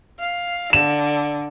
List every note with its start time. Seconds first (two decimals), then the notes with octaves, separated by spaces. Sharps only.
0.19 F5
0.73 D3 E7